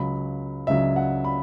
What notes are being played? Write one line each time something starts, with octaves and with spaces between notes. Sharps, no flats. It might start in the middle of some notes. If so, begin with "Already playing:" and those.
Already playing: C#2 C#3 F#3 B5
C#2 C#3 F#3 E5
F#5
B5